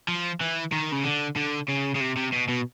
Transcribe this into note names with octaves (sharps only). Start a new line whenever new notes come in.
F3
E3
D#3
C#3
D3
D3
C#3
C#3
C3
C3
B2
B2